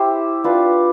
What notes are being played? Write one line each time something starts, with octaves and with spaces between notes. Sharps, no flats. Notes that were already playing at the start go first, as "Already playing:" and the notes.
Already playing: E4 G4 C5
D4 F4 B4